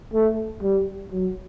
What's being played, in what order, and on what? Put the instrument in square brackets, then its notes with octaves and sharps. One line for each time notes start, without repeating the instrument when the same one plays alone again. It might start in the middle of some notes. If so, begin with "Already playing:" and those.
[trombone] A3
G3
F#3